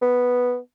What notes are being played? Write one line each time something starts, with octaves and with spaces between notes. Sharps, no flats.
B3